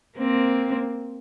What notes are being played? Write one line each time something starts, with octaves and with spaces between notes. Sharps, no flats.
A#3 C4